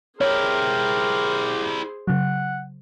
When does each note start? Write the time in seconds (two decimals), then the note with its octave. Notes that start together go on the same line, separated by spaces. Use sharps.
0.21 E4 G4 G#4 A#4 C5 C#5
2.08 C#3 F#3 F#5